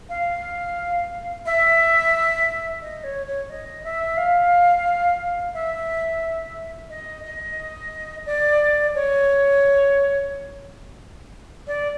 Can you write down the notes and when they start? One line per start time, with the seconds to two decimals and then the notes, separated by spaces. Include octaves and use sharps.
0.09 F5
1.45 E5
2.81 D#5
3.03 C#5
3.27 C#5
3.49 D#5
3.84 E5
4.17 F5
5.54 E5
6.89 D#5
7.24 D#5
8.25 D5
8.94 C#5
11.67 D5